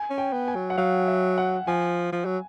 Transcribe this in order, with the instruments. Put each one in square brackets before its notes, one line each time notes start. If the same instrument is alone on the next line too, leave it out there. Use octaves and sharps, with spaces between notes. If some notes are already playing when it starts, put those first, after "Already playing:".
Already playing: [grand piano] G#5
[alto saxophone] C#4
[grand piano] G5
[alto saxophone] B3
[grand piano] G#5
[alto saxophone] F#3
[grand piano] F#5
[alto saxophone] F#3 [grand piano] F5
[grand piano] E5
F#5
[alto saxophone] F3 [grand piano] G#5
[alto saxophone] F3
F#3